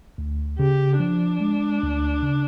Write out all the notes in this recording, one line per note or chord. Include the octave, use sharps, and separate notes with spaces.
D2
C#3 G4
F3 D4
G#3
D2
C#3